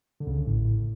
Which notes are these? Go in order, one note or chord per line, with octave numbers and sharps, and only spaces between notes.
D3
C#2 C#3
A1 A2
A2